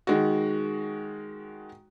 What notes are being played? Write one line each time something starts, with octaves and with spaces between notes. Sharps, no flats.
D#3 G#3 F#4